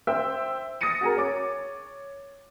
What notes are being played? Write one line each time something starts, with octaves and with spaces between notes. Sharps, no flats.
C5 E5 G5 E6
D#6 A6 A#6 C#7 D#7
F#4 G#4 A#4
C#5 D6